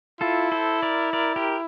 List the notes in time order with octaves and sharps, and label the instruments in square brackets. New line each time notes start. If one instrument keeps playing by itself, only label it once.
[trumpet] E4 [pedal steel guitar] F4 A4
[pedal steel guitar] A4 C5
A#4 D5
A#4 D5
G4 A#4